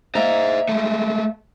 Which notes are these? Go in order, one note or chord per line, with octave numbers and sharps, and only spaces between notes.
A#3 C5 D#5 E5 A#5
G#3 A3